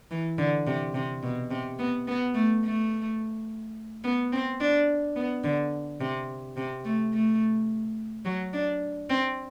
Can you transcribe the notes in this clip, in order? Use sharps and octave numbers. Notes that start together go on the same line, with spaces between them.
E3
D3
C3
C3
B2
C3
B3
B3
A3
A3
B3
C4
D4
B3
D3
C3
C3
A3
A3
F#3
D4
C4